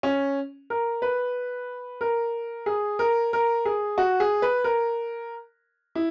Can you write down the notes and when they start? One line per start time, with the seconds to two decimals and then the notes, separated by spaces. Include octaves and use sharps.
0.03 C#4
0.70 A#4
1.02 B4
2.01 A#4
2.66 G#4
2.99 A#4
3.33 A#4
3.65 G#4
3.98 F#4
4.20 G#4
4.42 B4
4.64 A#4
5.95 E4